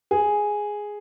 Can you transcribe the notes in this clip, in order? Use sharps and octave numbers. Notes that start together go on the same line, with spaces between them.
G#4